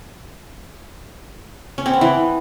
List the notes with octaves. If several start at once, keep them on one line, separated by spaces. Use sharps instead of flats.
C#4
C4
B3
E3